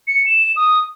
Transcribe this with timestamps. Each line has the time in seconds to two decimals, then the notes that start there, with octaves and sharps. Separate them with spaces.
0.07 C#7
0.26 E7
0.56 D#6